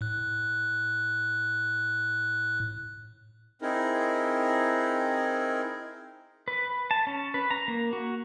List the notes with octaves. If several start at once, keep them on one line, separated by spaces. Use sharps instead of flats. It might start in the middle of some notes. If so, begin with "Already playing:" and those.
A2 F#6
C4 D#4 E4 G#4 A#4
B4
A5
C#4
B4
A#5
A#3
F#4